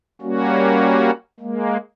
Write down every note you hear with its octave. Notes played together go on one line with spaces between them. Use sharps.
G3 A#3 C#4 F#4
G#3 A#3